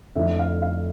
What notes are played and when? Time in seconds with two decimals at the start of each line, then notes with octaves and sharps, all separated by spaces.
0.15 F2 D3 A3 E4 E5
0.39 F5
0.62 F5